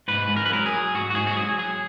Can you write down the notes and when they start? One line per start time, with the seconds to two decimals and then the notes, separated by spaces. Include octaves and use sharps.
0.08 G#2 B4
0.29 G#2
0.36 A#4
0.46 B4
0.51 F#3 A#4
0.66 G#4
0.73 F#3
0.94 G#2 F#4
1.10 F#4
1.15 G#2 G#4
1.27 F#4
1.37 F#3 G#4
1.59 F#3 G#4